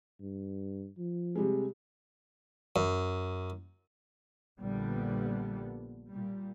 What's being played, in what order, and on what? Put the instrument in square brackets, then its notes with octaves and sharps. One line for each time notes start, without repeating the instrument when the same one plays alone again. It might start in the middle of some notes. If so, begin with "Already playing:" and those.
[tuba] G2
F3
[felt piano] C3 G3 G#3
[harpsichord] F#2
[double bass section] A#1 A#2 D3 G3 B3
A#2 G3